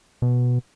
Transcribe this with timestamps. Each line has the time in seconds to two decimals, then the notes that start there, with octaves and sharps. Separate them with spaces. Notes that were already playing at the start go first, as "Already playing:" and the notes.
0.22 B2